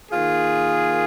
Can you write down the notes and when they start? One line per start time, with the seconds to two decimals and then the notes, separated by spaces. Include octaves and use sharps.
0.11 D#3 A#3 F4 G#4